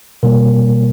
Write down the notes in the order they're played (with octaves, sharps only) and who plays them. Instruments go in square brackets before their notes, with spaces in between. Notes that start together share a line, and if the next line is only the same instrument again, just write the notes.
[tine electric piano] B2 G3 A#3 A#4